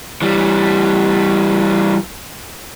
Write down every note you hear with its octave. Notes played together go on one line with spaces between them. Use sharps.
E3 G3